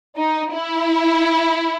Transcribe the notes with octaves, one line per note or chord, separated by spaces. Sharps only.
D#4
E4